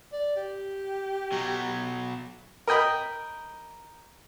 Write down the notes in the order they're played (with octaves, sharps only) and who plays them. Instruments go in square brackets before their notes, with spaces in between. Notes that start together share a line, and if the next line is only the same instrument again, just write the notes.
[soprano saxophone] D5
G4
[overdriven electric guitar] B2 F#3
[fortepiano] A#4 D#5 G5 B5